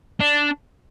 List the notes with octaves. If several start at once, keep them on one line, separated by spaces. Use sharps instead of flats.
D4